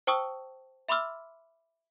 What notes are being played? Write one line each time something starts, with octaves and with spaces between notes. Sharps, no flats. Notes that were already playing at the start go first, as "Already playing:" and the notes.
C5 G5 A5 C#6 D#6 E6
E5 B5 C6 D6 E6 F6